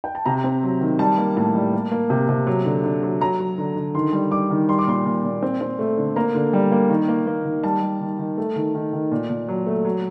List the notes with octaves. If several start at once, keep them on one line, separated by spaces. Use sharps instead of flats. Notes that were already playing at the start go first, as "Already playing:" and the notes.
G5
A5
C3 A#5
C4
F#3
D#3
G3 A5
A#3
A2 A5
G3
A#3
A#3
C3
C3
F#3
D3
D3
F#3
F#3 A#5
F#3
D3
D3
D#3 C6
G3
G3 D6
D#3
G3 C6
D6
A#2 C6
A#2
A#2
C4
C4
A3
D3
A#3 A#5
D3
G3
A#3
D#3
A#3
A#3
D#3
G3 A5
G3
D#3
D#3
A3
D#3
D#3
D#3
A#2
A#2
F#3
A3
F#3